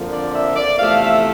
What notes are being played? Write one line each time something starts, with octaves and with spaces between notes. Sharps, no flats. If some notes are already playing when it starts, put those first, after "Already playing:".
Already playing: F2 D3 F3 A#3
D5
E5
D5
E2 C3 F3 A3 F5
E5